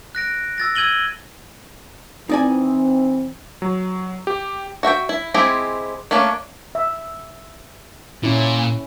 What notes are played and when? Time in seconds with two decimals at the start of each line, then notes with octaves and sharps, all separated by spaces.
0.15 F#6 A#6 D7
0.58 E6 A6 A#6
0.76 E6 G#6 D#7 F#7 G7
2.29 E3 C4 D#4 D5 G#5
3.62 F#3
4.27 G4
4.83 F#4 E5 F#5 G5
5.09 E4
5.34 G#3 C4 E4 G4 G#4
6.11 A3 A#3 C#4 D4
6.75 E5
8.24 A#2 C#4 E4